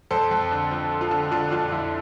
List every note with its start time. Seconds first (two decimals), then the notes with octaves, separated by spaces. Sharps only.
0.11 F2 A4 C5
0.31 F2
0.51 D3
0.71 F3
0.91 F3
1.01 F4 A4
1.11 D3
1.31 D3 D4 F4
1.51 F2 D4 F4
1.72 F2 E4